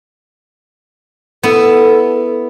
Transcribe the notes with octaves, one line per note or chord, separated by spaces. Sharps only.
B3 E4 A4